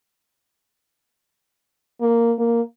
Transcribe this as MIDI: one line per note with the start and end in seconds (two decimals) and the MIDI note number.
2.01 2.33 58
2.39 2.61 58